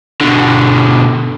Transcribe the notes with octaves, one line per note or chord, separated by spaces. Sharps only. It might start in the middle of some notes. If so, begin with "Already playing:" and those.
B2 D3